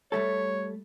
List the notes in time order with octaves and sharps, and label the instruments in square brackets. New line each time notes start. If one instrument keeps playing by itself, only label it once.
[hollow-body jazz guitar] G3 A3 A4 [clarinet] C#5